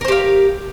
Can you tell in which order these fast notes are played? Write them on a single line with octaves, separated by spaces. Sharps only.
A#4 C5 G4 F5